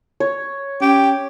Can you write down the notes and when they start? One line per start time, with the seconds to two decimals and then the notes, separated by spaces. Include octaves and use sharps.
0.20 C#5
0.82 C#4 G4